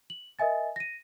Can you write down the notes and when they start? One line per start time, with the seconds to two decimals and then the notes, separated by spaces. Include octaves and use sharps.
0.10 F#7
0.39 A#4 D#5 E5 G#5 A6
0.76 A#6 D#7